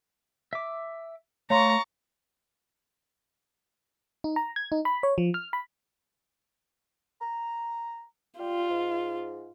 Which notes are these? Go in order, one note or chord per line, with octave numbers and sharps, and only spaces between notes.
E5 D6
A3 C#5 F5 A#5 C6 C#6 A6
D#4
A#5
G#6
D#4
B5
C#5
F3
F6
B5
A#5
G3 F4 G4
G#2